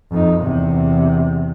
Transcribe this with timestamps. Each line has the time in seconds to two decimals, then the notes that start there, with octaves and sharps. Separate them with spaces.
0.11 F2 D#4
0.40 E2 C3